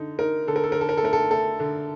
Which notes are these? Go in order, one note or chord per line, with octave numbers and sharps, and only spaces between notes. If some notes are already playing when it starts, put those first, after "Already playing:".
Already playing: D3 D#4
D#4 A#4
D3 A4
A#4
A4
D3 A#4
A4
A#4
A4
A3 A#4
A4
A3 A4
D3